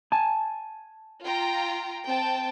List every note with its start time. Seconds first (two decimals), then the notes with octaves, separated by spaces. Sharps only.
0.12 G#5 A5
1.23 F4 G5 A#5
2.06 C4 G5 A5